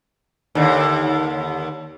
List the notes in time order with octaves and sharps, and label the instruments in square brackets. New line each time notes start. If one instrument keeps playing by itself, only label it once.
[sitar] D#2 D3